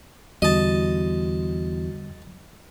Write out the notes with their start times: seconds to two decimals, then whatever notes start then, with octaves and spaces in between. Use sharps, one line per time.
0.42 E2 D3 G3 F#4 D#5 A5